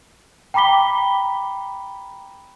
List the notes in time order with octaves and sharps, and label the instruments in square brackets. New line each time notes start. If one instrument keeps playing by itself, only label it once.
[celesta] G5 A#5 B5 D6 B6 G7